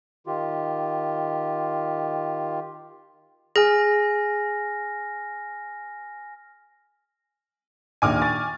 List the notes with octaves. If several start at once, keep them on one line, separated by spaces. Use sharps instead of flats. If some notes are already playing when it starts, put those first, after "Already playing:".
D#3 F4 G4
G#4 G#5 F6 A#6
A#1 D#2 G#5 D6 F6
C#6 A6